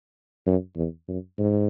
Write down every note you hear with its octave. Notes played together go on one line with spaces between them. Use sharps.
F#2
E2
F#2
G#2